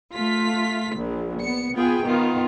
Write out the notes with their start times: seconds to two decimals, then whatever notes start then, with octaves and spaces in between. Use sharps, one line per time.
0.14 A3 F4 B6
0.96 A#1 F3
1.40 B3 C#7
1.76 B3 F4 G#4 G5
2.06 D#3 B3 F4